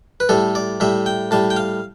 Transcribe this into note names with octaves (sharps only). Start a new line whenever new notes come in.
B4
A2 G3 A4
D5
A2 G3 E5
G5
A2 G3 A5
G5
F5